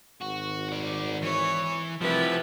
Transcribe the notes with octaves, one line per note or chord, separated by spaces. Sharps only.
G#1 F#4
F#4 D5
E3 C#5
C2 F3 E4 G4 B4